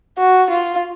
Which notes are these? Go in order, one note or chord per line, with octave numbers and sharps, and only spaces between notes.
F#4
F4